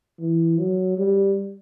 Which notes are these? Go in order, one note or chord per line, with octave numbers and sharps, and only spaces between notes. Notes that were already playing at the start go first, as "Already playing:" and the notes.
E3
F#3
G3